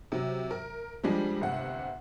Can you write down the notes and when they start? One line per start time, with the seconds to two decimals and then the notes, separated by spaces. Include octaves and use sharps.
0.12 C3 F#3
0.51 A#4
1.04 F3 G3 G#3 D4
1.41 G1 C3 F#5